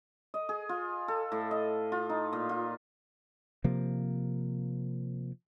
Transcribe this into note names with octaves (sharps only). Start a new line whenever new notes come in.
D#5
G#4
F4
A4
A2
D#5
F4
D#4
A#2
F4
C3 F3 A#3